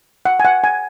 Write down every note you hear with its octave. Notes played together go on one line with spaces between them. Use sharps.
F#5
G#5
F#5
G#5